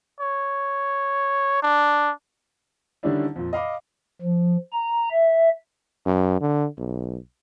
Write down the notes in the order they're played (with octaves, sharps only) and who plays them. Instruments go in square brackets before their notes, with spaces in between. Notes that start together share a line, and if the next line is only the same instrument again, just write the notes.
[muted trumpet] C#5
D4
[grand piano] D3 D#3 G3 C#4 D4 E4
F2 A#2
D#5 F5 B5 D6
[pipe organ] F3
A#5
E5
[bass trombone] F#2
D3
B1